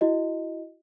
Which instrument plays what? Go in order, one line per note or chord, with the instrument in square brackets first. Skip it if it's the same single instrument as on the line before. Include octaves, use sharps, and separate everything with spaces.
[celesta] E4 F#4 D#5